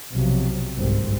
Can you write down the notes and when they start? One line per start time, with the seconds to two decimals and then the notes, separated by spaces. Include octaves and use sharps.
0.11 B1 C3 F3 F#3
0.77 G1 C2 G#2 G3 C4